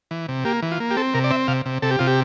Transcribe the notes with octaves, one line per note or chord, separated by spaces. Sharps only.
E3
C3
A#3 G4
E3
F4
A#3
G4
C4 A4
C3 A#4
D5
C4 E5
C3 F5
C3
C3 A4
G4
C3 F4
G4